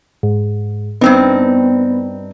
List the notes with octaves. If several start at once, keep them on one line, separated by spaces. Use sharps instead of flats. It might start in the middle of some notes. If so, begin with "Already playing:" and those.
G#2
G2 B3 C4 D#4